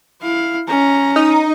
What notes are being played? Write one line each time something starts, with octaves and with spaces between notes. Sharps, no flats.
E4 F5
C#4 A#5
D#4